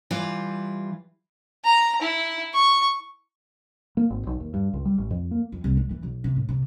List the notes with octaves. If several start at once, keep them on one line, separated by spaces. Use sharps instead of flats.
E3 G3 F4
A#5
E4
C#6
A#3
G#1
B1
D#2
G2
C#2
G3
A1
F2
A#3
F2
C2
G#3
E3
B1
C3
A2
C3